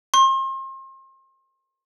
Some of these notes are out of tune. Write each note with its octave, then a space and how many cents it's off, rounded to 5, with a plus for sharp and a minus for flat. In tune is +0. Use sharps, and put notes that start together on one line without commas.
C6 +35